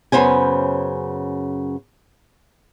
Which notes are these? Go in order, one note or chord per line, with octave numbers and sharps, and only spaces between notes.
F#2 C#3 B3 C#4 C5 G#5